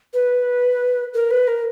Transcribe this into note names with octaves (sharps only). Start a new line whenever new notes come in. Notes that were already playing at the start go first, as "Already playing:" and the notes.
B4
A#4
B4
A#4